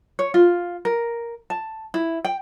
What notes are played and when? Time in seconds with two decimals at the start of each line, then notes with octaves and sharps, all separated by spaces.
0.19 C#5
0.34 F4
0.85 A#4
1.50 A5
1.94 E4
2.25 G5